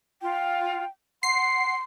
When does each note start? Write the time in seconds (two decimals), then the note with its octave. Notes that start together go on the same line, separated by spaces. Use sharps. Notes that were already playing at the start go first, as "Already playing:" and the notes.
0.22 F4 G5
1.23 F#5 C6 C7